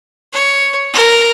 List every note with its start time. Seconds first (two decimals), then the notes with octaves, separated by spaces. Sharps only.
0.33 C#5
0.93 A#4